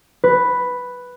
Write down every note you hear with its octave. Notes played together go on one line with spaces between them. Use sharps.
B4